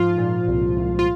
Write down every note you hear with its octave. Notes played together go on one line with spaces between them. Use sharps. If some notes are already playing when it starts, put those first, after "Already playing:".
Already playing: G#2 F3 F4
A#2
C2
C2
F4